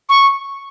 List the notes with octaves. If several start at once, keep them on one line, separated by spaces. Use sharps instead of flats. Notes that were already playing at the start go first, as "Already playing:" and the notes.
C#6